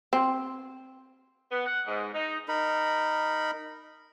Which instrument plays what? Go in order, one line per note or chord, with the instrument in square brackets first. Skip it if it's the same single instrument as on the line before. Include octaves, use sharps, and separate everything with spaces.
[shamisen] C4
[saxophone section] B3
F#5
G#2
D#4
[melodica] D#4 A#4 B5